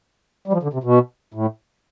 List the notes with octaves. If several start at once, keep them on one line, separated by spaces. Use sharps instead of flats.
G3
F3
D3
C3
B2
A2